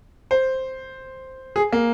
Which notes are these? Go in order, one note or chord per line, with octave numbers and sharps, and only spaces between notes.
C5
G#4
A#3